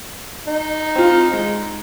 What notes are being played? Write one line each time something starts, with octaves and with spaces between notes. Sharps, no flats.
D#4
C4 F4
G#3